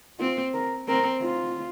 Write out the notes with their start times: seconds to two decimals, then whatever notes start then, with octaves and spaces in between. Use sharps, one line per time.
0.19 C4 F4
0.54 A#4
0.88 C4 A#4
1.23 F4